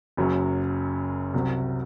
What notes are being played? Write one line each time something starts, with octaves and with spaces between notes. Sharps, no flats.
F#1 F#2 F#3
C2 C3 F#3